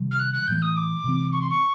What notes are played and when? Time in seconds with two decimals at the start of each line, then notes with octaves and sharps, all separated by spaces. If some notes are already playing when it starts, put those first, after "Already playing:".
Already playing: C3 D#3 G3
0.11 F6
0.19 F#6
0.33 F#6
0.47 A2 E3 A3 G6
0.62 D#6
0.76 D6
1.04 C3 E3 G#3 C4
1.32 C#6
1.41 C6
1.50 C#6